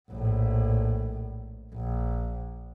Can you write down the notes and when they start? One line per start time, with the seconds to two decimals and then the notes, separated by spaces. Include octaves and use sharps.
0.11 A#1 A2
1.74 A#1